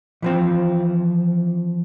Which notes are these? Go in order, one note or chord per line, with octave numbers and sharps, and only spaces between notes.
E3 F3 C4